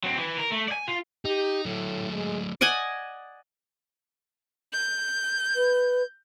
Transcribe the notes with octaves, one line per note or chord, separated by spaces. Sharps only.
F#3 C4
E3
A#4
A3
D5 G#5
F4
D#4 G4
A2 F#3 A3
G#3
D5 D#5 F#5 G#5
G6
B4